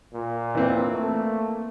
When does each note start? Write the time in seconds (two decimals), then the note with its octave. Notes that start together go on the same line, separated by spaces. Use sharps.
0.14 A#2
0.55 E3 A#3 C4
0.93 A3